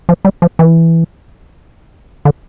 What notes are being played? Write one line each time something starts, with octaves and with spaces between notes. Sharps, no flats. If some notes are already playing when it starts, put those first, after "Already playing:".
F3
G3
F3
E3
D3